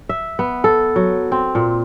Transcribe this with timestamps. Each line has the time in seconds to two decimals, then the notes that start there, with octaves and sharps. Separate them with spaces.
0.09 E5
0.39 B3
0.64 A4
0.96 F#3
1.32 C4
1.55 A#2